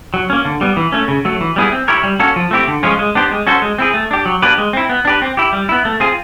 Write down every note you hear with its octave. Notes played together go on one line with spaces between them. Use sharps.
F#3
A#3 C#4
D3
G3 B3
E3
A3 C#4
C#3
F#3 A3
E3
G3 B3 E4 G#4
C4
E4 G4 A#4 C#5
G3
A#3 C#4 F#4 A4
F3
A3 C4 E4 G4
D3
F3 G#3 C#4 F4
G#3
B3 D4 G4 C5
G#3
C#4 F#4 A4 C5
G#3
C4 E4 G#4
A3
D4 G4
F#3
A#3 D4 G4 B4
G#3
C4 E4
B3
D4 G4 B4
C4
E4 G4
G3
B3 E4
A3
C4 F4 G#4